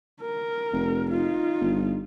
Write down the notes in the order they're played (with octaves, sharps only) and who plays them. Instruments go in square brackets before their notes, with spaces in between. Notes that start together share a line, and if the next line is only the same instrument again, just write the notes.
[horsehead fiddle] A#4
[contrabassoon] F1
[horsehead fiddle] D#4 F4
[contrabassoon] G1